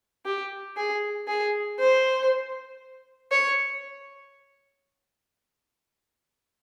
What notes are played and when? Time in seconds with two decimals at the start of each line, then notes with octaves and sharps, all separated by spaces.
0.26 G4
0.77 G#4
1.28 G#4
1.79 C5
3.32 C#5